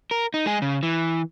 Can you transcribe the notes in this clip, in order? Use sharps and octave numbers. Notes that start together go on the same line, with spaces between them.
A#4
D#4
G#3 G#4
C#3
E3